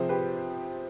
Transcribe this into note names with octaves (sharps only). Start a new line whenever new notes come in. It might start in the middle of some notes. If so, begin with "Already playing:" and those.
Already playing: C3 F3 G#4 C5
G4 B4